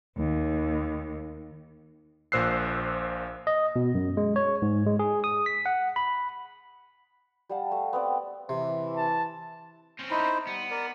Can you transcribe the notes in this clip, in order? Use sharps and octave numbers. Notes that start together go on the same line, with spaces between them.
D#2
A#1 A#2 C5 E6 F#6 C7
D#5
B2
F#2
G#3
C#5
G#2
G#3
G#4
D#6
B6
F#5
B5
G3 F5 F#5 A5
A3
B3 C4 D5
C3 E3
A5
C4 C#4
D#4 E4 C5
G3 B3
A#4 D5